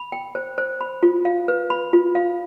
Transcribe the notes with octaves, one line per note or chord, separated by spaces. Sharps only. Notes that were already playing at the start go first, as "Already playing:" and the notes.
Already playing: B5
G5
C5
C5
B5
F4
F5
B4
B5
F4
F5